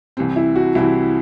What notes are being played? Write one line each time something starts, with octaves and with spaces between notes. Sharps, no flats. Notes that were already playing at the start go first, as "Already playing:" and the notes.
C2 C3 E3 C4
E4
F#4
C2 C3 E3 C4 E4